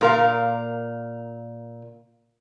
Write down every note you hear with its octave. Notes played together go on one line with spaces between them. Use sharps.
A#2 A#4 F5